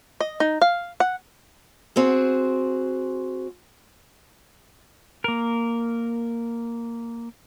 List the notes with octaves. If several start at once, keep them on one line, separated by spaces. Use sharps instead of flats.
D#5
D#4
F5
F#5
C4 F#4 G#4
A#3 A#4